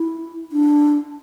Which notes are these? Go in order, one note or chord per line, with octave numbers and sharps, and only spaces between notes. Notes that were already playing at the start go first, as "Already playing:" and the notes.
Already playing: E4
D4